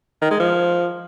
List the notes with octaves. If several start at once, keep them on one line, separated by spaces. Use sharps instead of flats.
D#3
G#3
F3